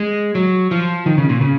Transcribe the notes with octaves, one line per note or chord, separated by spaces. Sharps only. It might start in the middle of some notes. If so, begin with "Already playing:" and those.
Already playing: G#3
F#3
F3
D#3
C#3
A#2
C#3